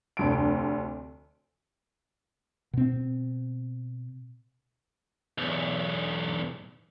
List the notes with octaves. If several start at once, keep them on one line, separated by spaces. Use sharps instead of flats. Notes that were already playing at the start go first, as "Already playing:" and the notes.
F1 D2 D7
B2 C4
B1 E2